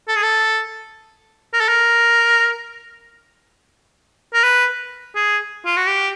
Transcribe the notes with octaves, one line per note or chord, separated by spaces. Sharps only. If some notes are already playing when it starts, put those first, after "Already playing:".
A4
G#4
A4
A#4
A4
A#4
A#4
B4
G#4
F4
F#4
G4